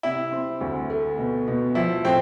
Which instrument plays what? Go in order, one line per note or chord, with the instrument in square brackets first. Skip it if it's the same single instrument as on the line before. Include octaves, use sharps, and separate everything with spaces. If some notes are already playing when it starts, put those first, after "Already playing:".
[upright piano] C3 [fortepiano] E4
[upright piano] C4
D2
A3
B2
B2
[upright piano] F3 [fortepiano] E4
[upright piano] A2 [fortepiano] C4